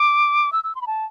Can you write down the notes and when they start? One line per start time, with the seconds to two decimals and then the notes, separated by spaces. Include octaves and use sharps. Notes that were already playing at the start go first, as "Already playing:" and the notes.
Already playing: D6
0.53 E6
0.64 E6
0.75 C6
0.82 B5
0.87 A5